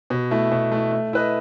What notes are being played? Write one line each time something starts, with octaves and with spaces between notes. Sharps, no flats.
B2
A3 E4
B2
A3 E4
A3
E4 B4 D#5